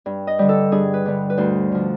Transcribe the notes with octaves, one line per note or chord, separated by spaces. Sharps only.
G2
D#5
D3 G3
A4
G2 G#4
B4
D3 G3
B4
D2 C5
D3 F3